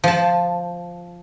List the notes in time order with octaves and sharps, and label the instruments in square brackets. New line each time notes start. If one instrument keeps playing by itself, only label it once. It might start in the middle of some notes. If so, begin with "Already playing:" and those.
[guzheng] F3 A5